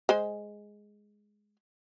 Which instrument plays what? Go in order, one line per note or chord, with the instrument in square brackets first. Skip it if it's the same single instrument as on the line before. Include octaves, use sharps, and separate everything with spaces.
[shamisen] G#3 C5 G#5